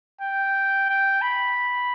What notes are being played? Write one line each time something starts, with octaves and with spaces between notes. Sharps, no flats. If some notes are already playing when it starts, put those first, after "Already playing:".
G5
G5
B5